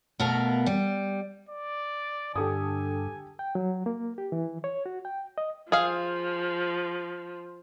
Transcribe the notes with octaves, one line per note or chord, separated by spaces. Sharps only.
B2 A3 B3 A#4 F5
G3
D5
G2 D3 G4 A4 G#5 D#6
G5
F#3
A#3
G4
E3
C#5
F#4
G5
D#5
F3 G#4 F5